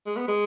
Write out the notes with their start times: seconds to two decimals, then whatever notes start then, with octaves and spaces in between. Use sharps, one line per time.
0.06 G#3
0.16 B3
0.28 G#3